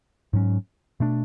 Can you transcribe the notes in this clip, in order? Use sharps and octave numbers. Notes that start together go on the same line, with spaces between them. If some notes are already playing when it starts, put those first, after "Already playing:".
G#2 F#3 C#4
B2 A3 D4